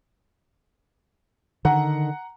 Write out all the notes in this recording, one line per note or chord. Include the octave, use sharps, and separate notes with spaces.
D3 D#3 F#5 A#5